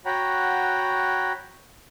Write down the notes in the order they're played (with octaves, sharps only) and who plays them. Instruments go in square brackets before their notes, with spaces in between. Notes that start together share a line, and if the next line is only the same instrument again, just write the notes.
[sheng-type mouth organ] F#4 C#5 F#5 G5 A#5 B5